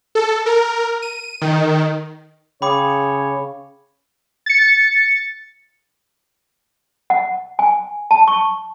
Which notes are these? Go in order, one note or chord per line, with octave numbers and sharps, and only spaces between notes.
A4
A#4
D#7
D#3
C#3 C#5 G5 B5 D6 D#6
A6 C#7
F#5
G#5
A5
C#6